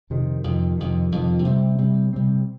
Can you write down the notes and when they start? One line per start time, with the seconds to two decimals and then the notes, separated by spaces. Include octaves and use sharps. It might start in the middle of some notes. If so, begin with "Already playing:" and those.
0.10 F2 C3 D#3
0.44 F2 C3 D#3
0.77 F2 C3 D#3
1.12 F2 C3 D#3
1.45 C3 G3 C4
1.78 C3 G3 C4
2.13 C3 G3 C4